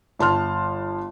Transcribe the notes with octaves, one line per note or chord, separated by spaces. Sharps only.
G1 A5 C6 F6